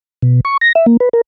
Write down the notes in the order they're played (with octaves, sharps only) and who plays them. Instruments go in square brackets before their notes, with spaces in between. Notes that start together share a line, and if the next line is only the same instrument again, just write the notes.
[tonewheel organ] B2
C#6
A#6
E5
A#3
B4
A#4